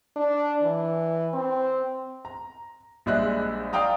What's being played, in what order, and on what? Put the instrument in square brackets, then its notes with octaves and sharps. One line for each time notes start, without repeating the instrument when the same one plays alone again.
[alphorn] D4
E3
C4
[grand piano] A#5
A#1 G3 G#3 E5 F#6
D5 F5 G5 A#5 D#6